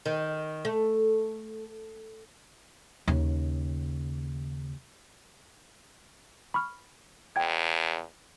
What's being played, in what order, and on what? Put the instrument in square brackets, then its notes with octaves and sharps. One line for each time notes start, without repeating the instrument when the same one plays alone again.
[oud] D#3
A3
[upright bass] D#2 C#3
[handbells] B5 C#6 F6
[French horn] E2 [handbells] G5 G#6